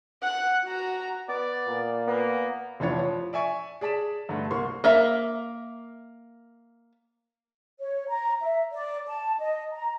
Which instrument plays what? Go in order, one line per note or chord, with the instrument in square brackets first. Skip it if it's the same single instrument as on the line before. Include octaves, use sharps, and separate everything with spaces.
[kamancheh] F#5 F#6
F#4 A#5
[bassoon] B3 [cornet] D5
[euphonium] A#2
[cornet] A#3 [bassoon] B3
[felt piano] F1 E3 F3 D4 C#5
F3
D5 E5 G#5 C#6
G#4 D5 A5 B6 E7
G2 D3 A3
C2 A#3 C6 C#6
[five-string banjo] A#3 A#4 E5 F5
[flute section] C#5
A#5
E5
D5
A5
D#5
A#5